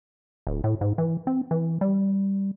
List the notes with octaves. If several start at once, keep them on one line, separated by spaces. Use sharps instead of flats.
D1
A2
G#2
E3
C4
E3
G3